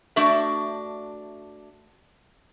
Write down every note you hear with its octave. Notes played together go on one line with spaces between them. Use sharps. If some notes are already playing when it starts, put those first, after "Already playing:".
A3 D4 F#4 D5 E5